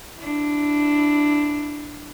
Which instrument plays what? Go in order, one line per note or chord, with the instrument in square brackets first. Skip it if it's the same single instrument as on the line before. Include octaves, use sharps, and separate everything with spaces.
[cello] D4 E4